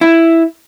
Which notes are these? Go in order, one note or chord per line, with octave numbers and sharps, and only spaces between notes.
E4